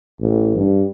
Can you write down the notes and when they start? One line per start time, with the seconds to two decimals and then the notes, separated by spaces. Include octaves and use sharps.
0.20 A1
0.56 G2